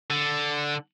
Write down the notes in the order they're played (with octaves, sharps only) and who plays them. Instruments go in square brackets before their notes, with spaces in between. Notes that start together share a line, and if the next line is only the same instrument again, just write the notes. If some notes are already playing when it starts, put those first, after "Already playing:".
[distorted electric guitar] D3